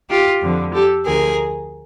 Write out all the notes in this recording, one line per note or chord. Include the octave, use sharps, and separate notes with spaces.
F4 G4
F2 D3 F3
G4 A4
D2 D3 F3 G#4 A#4